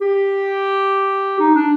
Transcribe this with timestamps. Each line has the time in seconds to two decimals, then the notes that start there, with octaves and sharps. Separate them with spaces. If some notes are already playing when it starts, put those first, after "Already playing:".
0.01 G4
1.39 D#4
1.55 D4